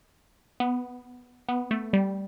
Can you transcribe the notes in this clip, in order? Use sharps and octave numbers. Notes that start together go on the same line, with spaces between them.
B3
B3
A3
G3